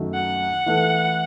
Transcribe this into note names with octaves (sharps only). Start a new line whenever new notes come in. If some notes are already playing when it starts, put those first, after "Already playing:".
Already playing: F#2 D#3 A3 D#4 F#4
F#5
E3 A3 E4 A4